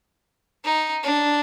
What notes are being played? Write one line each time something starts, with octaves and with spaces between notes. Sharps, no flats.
D#4
D4